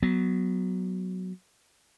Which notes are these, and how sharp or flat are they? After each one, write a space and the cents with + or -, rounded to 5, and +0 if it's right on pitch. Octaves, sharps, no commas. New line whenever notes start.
F#3 +0 B3 +0